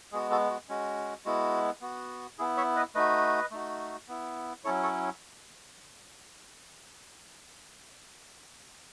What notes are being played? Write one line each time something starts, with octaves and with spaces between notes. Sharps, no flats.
G#3 B3 F#4 G#4
F#4 A4
F#4
G#3 C#4 F#4
G#3 B3 E4 F#4
B3 F#4
B3 E4 G#4
C#5 E5
B4 D#5
A3 D#4 F#4 B4 D#5
A3 D#4 F#4
B3 E4
F#3 C#4 E4 A4 C#5
A4 C#5